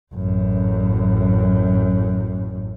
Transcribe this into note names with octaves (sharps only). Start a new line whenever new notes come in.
A1 F#2